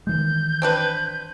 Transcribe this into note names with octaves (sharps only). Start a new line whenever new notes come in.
D#3 E3 G#3 G6
C4 D4 B4